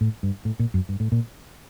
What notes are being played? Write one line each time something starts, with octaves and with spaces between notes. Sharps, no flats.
A2
G2
A2
A#2
F#2
G2
A2
A#2